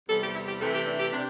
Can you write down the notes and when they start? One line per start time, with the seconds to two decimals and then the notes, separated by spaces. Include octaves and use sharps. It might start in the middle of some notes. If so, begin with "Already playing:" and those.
0.09 E2 C3 G3 A4
0.22 G4
0.35 E4
0.48 G4
0.61 C3 E3 A3 A4
0.74 G4
0.87 D4
1.00 G4
1.13 C3 D4